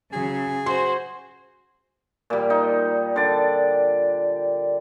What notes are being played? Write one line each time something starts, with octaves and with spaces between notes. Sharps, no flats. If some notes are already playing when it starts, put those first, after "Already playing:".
C#3 F#3 G#4
F#4 C5 C6
A#2 G3
D#4
D3 D5